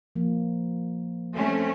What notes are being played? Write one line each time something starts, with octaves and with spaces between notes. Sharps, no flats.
F3 A#3
A3 C4 C#4